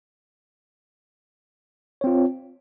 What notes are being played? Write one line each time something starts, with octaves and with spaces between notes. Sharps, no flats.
C4 F4 C#5